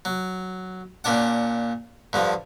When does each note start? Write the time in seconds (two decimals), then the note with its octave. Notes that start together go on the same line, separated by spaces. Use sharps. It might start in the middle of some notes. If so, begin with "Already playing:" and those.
0.05 F#3
1.04 A#2 C#4 D4 F#5
2.13 G2 D3 F3